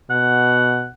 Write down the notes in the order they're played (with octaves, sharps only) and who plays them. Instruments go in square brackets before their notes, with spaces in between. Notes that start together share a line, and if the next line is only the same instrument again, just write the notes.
[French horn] B2 [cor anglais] F#5